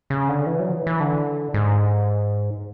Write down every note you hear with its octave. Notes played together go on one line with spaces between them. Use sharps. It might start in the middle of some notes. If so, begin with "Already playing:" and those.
C#3
D3
E3
F#3
E3
E3
D3
G#2